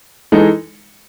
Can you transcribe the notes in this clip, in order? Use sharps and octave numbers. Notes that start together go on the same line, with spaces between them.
E3 G#3 D#4 A4